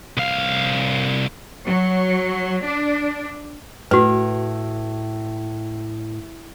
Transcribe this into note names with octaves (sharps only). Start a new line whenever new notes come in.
C2 F5
F#3
D4
A2 F#4 B4